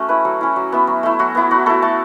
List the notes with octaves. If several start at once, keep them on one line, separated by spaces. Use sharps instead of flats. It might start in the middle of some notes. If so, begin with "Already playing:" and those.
Already playing: A3 C#4 F#4
E4 B4
F#3 A4
C#4 E4
F#3
B3 E4
F#3
A3 E4
F#3 F#4
B3 E4
F#3 F#4
A3 E4 A4
A3 A5